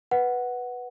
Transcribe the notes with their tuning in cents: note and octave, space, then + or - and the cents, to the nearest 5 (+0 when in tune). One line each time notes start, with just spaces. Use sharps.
B4 +0 F#5 +0